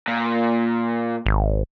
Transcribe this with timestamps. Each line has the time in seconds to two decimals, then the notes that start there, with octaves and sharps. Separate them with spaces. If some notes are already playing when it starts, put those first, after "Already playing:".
0.08 A#2
1.26 G#1